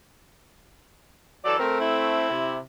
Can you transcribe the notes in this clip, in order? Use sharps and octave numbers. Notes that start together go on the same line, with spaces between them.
E3 F#3 A4 D5
A3 C4 A#4
E4
C3